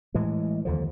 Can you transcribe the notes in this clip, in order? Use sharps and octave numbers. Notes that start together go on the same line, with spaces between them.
A2 E3 G#3
D#2 D3 F3